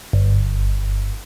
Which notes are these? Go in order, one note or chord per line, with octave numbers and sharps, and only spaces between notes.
G1